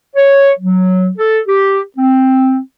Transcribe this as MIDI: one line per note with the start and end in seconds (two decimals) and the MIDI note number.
0.16 0.50 73
0.59 1.09 54
1.18 1.40 69
1.47 1.80 67
1.97 2.59 60